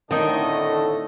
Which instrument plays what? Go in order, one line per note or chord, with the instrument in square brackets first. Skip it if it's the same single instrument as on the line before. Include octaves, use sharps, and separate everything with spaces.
[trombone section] A2 D3 A3 [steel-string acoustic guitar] D#3 [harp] C4 D#4 [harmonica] D#5 A5